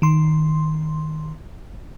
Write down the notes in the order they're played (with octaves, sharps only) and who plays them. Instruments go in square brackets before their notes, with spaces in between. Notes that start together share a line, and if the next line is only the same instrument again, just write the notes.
[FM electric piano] D#3 C6